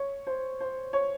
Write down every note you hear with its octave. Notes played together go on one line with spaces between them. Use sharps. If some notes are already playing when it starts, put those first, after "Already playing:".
Already playing: C#5
C5
C5
C#5